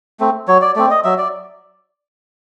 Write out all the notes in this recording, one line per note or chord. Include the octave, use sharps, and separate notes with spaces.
A3 C4
F#3 C#5
D5
A3 C4 D5
D#5
F#3 E5
D5